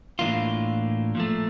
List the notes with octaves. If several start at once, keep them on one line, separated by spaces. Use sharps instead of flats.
A2 E3 A#3 D4 F4
A#2 F3 A3